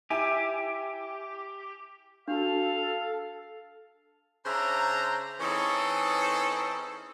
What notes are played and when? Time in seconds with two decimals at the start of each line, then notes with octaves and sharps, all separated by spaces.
0.10 E4 G4 G#5
2.28 D4 F#4 A4 F5
4.45 C#3 D4 C5 E5 A#5
5.40 E3 C4 C#4 D#4 G#4 A4